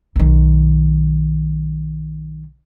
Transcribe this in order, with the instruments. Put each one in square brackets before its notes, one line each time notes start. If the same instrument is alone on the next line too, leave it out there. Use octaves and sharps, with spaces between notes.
[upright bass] B1 D#3